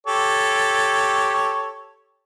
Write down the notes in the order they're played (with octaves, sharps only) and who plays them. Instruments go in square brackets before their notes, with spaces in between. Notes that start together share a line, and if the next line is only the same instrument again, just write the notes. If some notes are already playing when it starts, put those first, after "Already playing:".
[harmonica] G4 A4 C#5